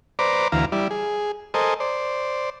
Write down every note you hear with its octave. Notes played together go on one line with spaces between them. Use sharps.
B4 C5 D5 A#5 D6
D2 E3 F5 A#5
G3 E4 D5
G#4
A4 A#4 C5 D#5 G#5
C5 D5